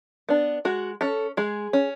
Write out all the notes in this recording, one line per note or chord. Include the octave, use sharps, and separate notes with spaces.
B3 D4
G#3 F#4
C#4 A4
G#3 G#4
C#4